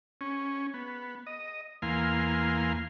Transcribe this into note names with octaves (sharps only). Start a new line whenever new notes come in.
C#4
B3
D#5
E2 A#3 F5 G#5 C6